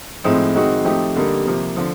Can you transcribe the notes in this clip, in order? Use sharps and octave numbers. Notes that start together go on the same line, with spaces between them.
A2 F3 G#3 C4 D#4
D#3 G#3 C4 D#4 F#4
F3 A3 C4 D#4 G4
D3 G3 A#3 D#4
C3 F3 A#3
D3 F3